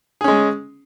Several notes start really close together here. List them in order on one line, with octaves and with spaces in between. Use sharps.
G#4 C#4 G#3